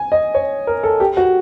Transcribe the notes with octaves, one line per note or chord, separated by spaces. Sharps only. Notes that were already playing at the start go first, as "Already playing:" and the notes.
Already playing: G#5
D#5
C#5
A#4
A4
G4
F#4